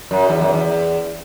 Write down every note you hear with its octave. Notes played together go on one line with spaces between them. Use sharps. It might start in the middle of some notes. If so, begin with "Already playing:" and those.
F#2
E2
F#2
E2